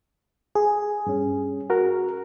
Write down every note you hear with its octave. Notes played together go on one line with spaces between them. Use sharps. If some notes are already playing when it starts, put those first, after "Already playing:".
G#4
G2 C#4
F#4 A#4